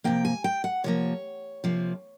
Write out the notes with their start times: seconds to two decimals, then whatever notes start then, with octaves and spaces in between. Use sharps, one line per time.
0.04 C3 F3 A#3 G5
0.25 G#5
0.44 G5
0.64 F#5
0.84 C3 F3 A#3 C#5
1.64 C3 F3 A#3